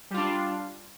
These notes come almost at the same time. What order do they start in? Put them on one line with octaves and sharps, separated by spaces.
G3 F4 D4